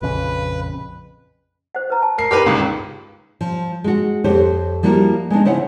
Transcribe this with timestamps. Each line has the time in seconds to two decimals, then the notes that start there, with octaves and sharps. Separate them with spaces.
0.02 A#1 F2 C#3 B4
1.75 C5 F#5
1.90 B4 A#5
2.02 A5
2.18 A#4 C7
2.31 D#4 G4 A#4 B4 C6
2.46 G1 C#2 G#2
3.41 F3
3.84 G#3 F#4
4.24 F2 G4 C5 C#5
4.83 F3 G3 A#3 E4 F#4
5.30 G#3 B3 D4 D#4
5.45 C#3 F3 E4 C5 C#5 F#5